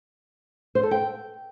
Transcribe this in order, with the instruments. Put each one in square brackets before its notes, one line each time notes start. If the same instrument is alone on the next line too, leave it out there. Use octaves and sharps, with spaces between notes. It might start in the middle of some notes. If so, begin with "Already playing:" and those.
[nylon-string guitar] C5
A4
G5